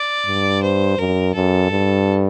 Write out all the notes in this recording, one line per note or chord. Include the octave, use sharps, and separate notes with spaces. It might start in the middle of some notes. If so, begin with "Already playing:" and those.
Already playing: D5
G2
C5
F#2 A#4
F#2 A4
G2